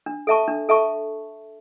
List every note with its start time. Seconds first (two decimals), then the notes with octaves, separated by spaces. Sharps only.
0.06 D4
0.27 A4 E5 A5 C#6
0.48 D4
0.69 A4 E5 A5 C#6